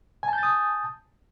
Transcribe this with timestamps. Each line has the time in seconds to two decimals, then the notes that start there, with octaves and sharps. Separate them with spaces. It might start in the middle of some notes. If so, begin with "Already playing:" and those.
0.23 G#5
0.28 A5
0.33 G6
0.38 A6
0.43 D#6